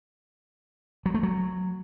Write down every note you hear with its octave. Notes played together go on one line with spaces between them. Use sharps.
F#3
A3
F#3